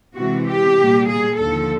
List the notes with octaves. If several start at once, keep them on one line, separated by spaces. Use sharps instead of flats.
C3 E3 G#3 C4 F#4
G4
A#2 G3 A#3
G#4
D#2 D3 F3 A4